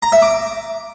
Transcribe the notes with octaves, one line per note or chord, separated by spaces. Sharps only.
A#5
E5
D6